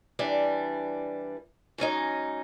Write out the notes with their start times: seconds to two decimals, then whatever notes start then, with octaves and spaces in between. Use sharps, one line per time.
0.19 E3 G3 D4
1.78 G#2 F#3 C#4 D#4